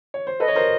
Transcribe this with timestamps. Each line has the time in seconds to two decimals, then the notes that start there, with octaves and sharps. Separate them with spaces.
0.14 C#5
0.27 C5
0.40 A4 B4 D#5
0.48 C#5
0.56 A#4 C5